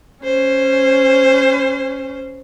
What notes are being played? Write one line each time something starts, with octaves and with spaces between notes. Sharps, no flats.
C#4 C5